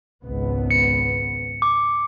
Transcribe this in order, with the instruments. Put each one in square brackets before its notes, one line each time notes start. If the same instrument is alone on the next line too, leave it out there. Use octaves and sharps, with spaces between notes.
[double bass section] G#1 C#2 B3
[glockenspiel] C#7
D6